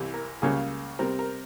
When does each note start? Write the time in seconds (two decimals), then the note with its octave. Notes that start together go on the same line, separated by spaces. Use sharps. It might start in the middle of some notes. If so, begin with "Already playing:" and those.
Already playing: C2 C3 E3 G3
0.14 A#4
0.42 C#2 C#3 G3 A#3 C#4 G#4
0.99 C3 G3 C4 A#4
1.19 A#4